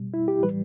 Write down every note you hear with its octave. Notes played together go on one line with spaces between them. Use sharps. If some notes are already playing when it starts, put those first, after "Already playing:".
Already playing: B2 G3
E4
G4
A2 E3 G3 B4